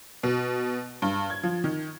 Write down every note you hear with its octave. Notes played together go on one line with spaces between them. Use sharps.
B2
G2
G#6
F3
D#3